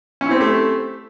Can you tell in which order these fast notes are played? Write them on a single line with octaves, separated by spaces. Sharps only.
C#4 E4 C4 G4 A3